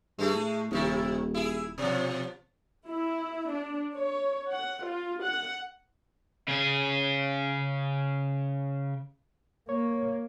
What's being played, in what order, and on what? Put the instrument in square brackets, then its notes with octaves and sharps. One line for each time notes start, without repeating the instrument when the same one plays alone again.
[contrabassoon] G2 [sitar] G#3 A3 G#4
[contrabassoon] A2
[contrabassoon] D#1 [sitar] C3 D#3 E4
[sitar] E4 G#4
B2 F3
[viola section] E4
D4
C#5
F#5
F4
F#5
[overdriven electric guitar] C#3 G#4
[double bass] A#3 [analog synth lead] C#5